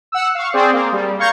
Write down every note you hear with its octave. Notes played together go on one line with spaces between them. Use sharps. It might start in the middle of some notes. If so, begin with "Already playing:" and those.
F#5 E6
F5 C#6
C4 G#4 C5 D5
A#3
G3
F5 A#5 C#6 G6 G#6